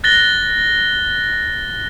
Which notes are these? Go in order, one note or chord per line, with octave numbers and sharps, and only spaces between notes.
F#6 A6 A#6 G7